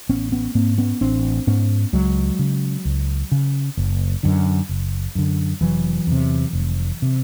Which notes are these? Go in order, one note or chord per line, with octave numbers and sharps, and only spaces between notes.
A1 B3 C#4
B3 C#4
G#2 A#3 C4
B3 C#4
A1 C4 D4
G#2 B3 C#4
C#2 F#3 G#3
C#3
C#2
C#3
F#1
F#2 D3
F#1
F#2 D3
F1 E3 F#3
E2 C3
F1
C3